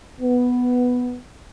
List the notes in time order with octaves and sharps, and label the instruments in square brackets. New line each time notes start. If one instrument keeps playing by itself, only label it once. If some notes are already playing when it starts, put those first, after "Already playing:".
[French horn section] B3